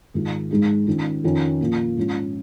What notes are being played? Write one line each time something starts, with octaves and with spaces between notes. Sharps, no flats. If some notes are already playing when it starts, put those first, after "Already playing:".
G#2 D#3 G#3 F4
G#2 G#3 D#4
D#3 C#4 F4
F2 D#3 C#4 F4
A#2 F3 A#3
G#2 F3 C#4 F4